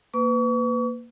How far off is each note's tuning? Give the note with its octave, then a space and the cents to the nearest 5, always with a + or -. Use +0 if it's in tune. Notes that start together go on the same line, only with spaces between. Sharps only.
A#3 +0 B4 +25 C#6 +40